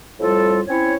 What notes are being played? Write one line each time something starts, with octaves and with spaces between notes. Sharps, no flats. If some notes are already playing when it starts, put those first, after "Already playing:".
F2 A2 G3 F4 A4
C4 C#4 E4 C#5